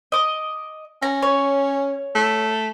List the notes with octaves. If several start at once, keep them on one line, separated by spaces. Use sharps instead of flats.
D#5 D6
C#4 A#5
C#5
A3